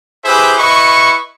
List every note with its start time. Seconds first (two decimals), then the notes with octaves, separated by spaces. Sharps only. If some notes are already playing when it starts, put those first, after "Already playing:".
0.24 E4 G4 G#4 B4 C5 E5
0.58 E4 B4 D#5 C#6